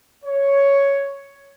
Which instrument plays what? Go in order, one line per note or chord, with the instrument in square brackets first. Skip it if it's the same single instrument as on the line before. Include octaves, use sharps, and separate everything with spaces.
[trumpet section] C#5